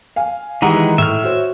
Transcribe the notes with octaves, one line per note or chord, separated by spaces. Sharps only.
F5 G#5
D#3 E3 G#3 G4 F#5 A#5
A2 E5 F6
F#4 C5 C#5